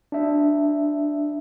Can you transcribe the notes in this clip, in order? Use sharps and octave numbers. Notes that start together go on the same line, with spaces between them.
D4 E5